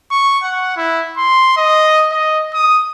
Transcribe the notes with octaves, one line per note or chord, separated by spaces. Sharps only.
C#6
F#5
E4
C6
D#5
D#5
D#6